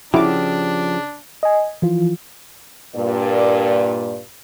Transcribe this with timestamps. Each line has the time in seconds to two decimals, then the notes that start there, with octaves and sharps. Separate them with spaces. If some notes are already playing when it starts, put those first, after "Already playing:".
0.14 C#3 F3 D4 E4 F#4 G4 D6
1.43 D#5 G#5
1.82 E3 F3 F4
2.95 G2 A#2 D5